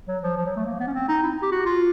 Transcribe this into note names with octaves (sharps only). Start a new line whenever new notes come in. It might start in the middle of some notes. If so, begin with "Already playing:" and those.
F#3
F3
F3
F#3
A3
A#3
B3
C#4
C4
D#4
E4
G4
F#4
F4